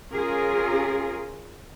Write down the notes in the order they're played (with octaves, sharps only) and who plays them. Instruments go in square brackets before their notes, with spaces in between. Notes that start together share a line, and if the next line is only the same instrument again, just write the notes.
[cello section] C#4 F4 G#4 A#4